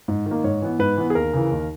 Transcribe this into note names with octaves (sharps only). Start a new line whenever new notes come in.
G#2
D#3
A#3
G#2 C#5
E3 B3
G#2 B4
E3 B3
G#4
D#2 A#4
C#3 E3
D#2